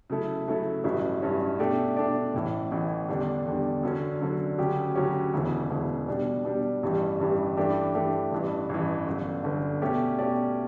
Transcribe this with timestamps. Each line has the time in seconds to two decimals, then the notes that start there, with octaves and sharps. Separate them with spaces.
0.10 C#3 F#3 A3 E4 A4
0.47 C#3 F#3 A3 E4 A4
0.84 A1 G2 F#3 C#4 E4
1.22 A1 G2 F#3 C#4 E4
1.59 B2 A3 D4 G4 D5
1.96 B2 A3 D4 G4 D5
2.34 A1 A2 E3
2.71 A1 A2 E3
3.09 E2 D3 G3 D4
3.46 E2 D3 G3 D4
3.83 F#2 D3 F#3 C#4
4.21 F#2 D3 F#3 C#4
4.58 D2 C#3 F#3 C#4 G4
4.96 D2 C#3 F#3 C#4 G4
5.33 E1 D2 C#3 E3
5.70 E1 D2 C#3 E3
6.08 B2 G3 D4
6.45 B2 G3 D4
6.83 A1 G2 E3 G3
7.20 A1 G2 E3 G3
7.57 G2 E3 A3 D4 G4
7.94 G2 E3 A3 D4 G4
8.32 A1 G2 E3
8.69 A1 G2 E3
9.07 G1 F#2 D3
9.43 G1 F#2 D3
9.81 B2 A3 C#4 G4 D5
10.19 B2 A3 C#4 G4 D5